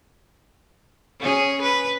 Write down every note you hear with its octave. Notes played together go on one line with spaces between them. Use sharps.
C#4 G#4
B4